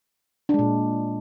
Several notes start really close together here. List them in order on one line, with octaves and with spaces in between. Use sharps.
D4 G#3 A#2